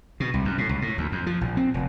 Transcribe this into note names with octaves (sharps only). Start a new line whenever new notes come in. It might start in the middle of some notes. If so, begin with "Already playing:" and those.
B2
C2
F#2
A2
C#2
A2
D2
F2
F3
A#1
C4
F1